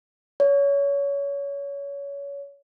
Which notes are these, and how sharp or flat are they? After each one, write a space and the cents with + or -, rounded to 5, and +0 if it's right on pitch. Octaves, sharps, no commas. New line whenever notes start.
C#5 +25